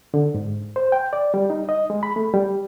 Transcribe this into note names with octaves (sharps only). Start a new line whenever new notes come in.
D3
G#2
C5
G5
D5
G3
D#4
D#5
G#3
B5
A3
G3